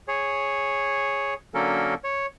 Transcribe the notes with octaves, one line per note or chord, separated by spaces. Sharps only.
G#4 C#5
D3 F#3 A#3 C#4 A4 A#4
C#5